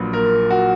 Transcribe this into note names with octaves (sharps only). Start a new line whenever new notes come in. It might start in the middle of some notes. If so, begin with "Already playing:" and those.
Already playing: A#1 A#2 F#3 B4
A#4
F#4